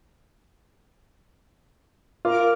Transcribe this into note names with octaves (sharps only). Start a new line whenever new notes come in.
F4 A#4 D6 F6